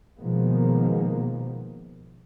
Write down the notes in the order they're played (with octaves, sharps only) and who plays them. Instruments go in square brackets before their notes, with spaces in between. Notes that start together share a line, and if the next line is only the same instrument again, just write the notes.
[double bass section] B2 D#3 F3 G#3 A#3 B3